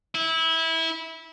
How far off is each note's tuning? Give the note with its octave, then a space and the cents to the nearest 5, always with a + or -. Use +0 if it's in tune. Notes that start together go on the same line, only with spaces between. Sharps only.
E4 -20